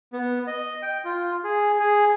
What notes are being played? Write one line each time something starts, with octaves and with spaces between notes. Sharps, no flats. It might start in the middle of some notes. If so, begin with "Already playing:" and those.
B3
D#5
G5
F4
G#4
G#4